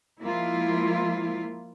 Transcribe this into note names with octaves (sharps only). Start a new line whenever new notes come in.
F3 G#3 A#3 E4 F4